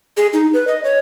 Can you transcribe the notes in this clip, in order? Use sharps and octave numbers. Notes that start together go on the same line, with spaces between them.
G#4
D#4
B4
D#5
C#5